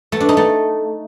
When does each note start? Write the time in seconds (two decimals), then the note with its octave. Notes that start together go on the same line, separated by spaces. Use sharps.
0.12 A3
0.20 D4
0.29 D#4
0.37 A3